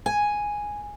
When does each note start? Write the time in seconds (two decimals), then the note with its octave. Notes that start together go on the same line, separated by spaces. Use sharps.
0.06 G#5